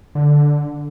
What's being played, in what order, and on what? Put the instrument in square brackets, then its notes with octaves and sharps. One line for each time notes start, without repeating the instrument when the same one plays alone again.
[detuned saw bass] D3